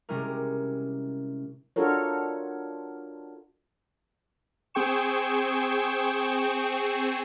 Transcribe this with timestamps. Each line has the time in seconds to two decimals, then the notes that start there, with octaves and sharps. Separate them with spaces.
0.09 C3 G3 G#3 C#4 E4 A#4
1.76 D4 F4 F#4 A4 A#4 C#5
4.74 C4 G#4 G5 C#6 E7